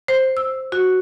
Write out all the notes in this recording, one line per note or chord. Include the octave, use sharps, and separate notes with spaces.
C5
E6
F#4